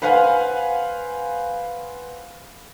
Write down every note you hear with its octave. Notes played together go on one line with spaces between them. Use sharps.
B4 C5 F5 F#5 G#5